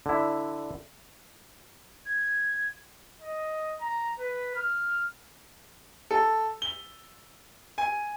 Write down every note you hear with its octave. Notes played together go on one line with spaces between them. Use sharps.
D3 E4
G#6
D#5
A#5
B4
F6
A4
G7
G#5